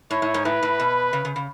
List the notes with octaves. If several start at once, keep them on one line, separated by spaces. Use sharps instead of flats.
A2 C#5
A2
G#2
A2 B4
A2
B2
C#3
C#3
C#3